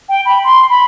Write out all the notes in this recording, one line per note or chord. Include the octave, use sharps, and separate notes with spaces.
G5
B5
C6
B5